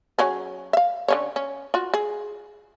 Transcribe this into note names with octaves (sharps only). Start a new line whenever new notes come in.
F#3 C#4 G#4
E5 F5
D3 C#4 C#5
C#4
F4 F#4
G#4